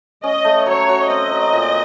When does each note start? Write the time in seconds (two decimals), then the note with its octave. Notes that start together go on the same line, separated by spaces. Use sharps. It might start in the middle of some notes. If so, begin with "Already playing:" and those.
0.23 C#4 D#5
0.45 A3
0.66 F#3 C#5
0.89 F#4
1.09 C4 D#5
1.31 F#3
1.53 A#2